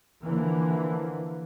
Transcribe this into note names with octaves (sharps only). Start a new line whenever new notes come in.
D3 E3 F3 A#3